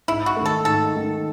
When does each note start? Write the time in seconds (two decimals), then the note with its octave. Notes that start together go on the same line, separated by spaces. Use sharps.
0.08 G#2 E4
0.26 F#4
0.36 D#3 A3
0.46 A4
0.65 G#2 A4
0.95 D#3 A3